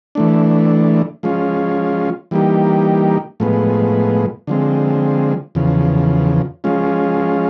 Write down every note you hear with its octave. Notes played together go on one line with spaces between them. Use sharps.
E3 A3 D4
F3 G#3 C#4 F4
E3 G3 A#3 D#4 G4
A2 F3 G#3 B3
D3 F3 G#3 C4
E2 C#3 F3
F3 G#3 C#4 F4